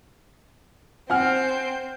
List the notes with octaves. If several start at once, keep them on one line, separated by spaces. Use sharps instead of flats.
C4 F#5 G#5 F6 G6